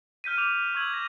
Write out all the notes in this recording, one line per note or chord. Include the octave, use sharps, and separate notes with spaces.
F6 G6 B6 D#7
D6 F7
C#6 E6 G#6 F#7
A#6 E7